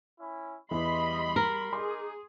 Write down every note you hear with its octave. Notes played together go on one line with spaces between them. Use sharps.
C#4 E4
E2 E3 G3 D#5 B5 C6
A#4
G#3 D#4 G#4 C6 D6